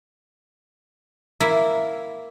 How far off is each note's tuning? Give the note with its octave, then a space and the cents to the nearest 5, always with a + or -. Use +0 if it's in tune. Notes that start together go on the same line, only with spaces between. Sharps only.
A#3 +0 E4 +0 E5 +0